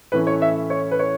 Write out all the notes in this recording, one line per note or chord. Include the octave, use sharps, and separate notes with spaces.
A2 E3 A3 C#4 B4
C#5
E5
C#5
B4
C#5